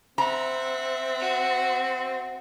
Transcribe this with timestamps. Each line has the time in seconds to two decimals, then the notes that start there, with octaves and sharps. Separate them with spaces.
0.18 C4 E5 F#5 A#5
1.20 F#4